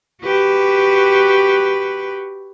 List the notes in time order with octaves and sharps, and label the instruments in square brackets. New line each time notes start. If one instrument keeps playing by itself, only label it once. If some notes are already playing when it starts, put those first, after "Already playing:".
[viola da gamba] F#4 G4 B4